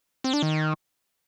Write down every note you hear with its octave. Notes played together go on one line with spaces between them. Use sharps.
C4
D4
D#3